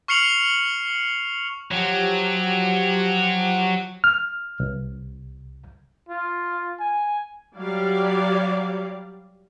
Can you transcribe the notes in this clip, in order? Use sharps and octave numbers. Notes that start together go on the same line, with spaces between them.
C#6 F6 C7 C#7 F7 F#7
F3 F#3 G4 D7
F6
C2
F4
G#5
F#3 G3 G4 D5 F5